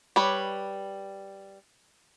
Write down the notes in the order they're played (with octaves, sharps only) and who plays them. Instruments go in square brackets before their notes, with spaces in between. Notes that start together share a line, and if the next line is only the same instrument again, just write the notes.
[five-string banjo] G3 B4 C#5